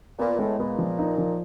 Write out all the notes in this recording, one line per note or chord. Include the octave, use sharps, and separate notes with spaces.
A#2 B3
A2 G#3
A#2 B3
F3
D#4
F3